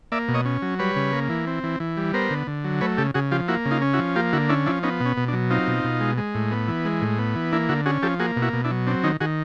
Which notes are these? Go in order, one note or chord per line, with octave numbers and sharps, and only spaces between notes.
A#3 D5 E5
B2
C#5 D#5
C#4
F#3
G3 B4 C#5
C#3
A#3
E3
C4
E3
E3
G3
B3 A#4 C5
D3
D3
F#3
A3 B4 C#5
C#3 G4 A4
C#3 F#4 G#4
F3 F4 G4
A#3 E4 F#4
C#3
D#4 F4
C#4
E4 F#4
F3
A#3 F4 G4
D3 E4 F#4
C#4 D4 E4
F3 D4 E4
B3 C#4 D#4
B2
C#4
B2
D4
F#3
C4 D#4 F4
B2
B2
G#3
G#3
A2
B3
E3
G#3
A2
B3
E3
A#3 D4 E4
D3 E4 F#4
C#4 F#4 G#4
F3 G4 A4
A#3 F#4 G#4
B2
E4 F#4
B2
D4 E4
F#3
C4 D4
D#3 C#4 D#4
D#3 F#4 G#4